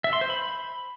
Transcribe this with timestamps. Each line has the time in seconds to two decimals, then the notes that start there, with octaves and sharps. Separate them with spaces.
0.04 E5
0.13 C6
0.21 C5
0.30 B5